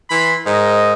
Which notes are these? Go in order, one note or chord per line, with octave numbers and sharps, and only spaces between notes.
E3 B5 C6
G#2 A#4 D#5